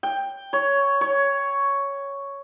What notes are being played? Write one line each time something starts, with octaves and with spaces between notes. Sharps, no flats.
G5
C#5
C#5